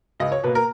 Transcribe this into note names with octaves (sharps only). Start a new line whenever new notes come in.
C#2 D#5
C#5
B2 A#3 B4
A#4